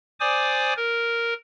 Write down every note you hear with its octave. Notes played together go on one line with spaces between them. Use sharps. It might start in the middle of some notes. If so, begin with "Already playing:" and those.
C5 D5 G#5 D6 D#6
A#4